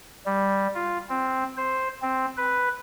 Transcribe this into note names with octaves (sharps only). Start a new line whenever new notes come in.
G3
F4
C4
C5
C4
B4